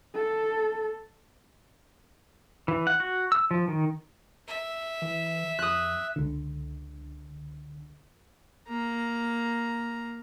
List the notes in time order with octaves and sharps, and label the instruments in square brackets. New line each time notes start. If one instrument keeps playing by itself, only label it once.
[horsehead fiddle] A4
[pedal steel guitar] E3
F#5
F#4
E6
F3
D#3
[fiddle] E5
[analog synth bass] E3
[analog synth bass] F2 [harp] D#6 F#6
[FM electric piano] C#2 D3
[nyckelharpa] A#3 A#5